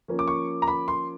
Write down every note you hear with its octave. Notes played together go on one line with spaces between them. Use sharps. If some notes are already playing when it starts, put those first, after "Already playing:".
F3 A#3 C#4
D6
C#6
A#5
B5
C6